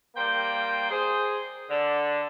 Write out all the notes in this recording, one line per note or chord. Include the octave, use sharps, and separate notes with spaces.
G3 A#3 C5 G5
G#4 C5
D3